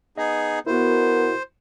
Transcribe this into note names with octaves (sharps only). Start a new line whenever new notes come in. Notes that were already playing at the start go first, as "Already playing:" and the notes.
B3 D#4 G#4 D#5
B2 B3 E4 F#4 A#4 C5